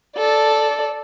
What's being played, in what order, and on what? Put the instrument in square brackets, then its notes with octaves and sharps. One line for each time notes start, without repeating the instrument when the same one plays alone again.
[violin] A4 D5